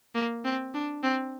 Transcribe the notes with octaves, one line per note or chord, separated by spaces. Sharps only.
A#3
C4
D4
C4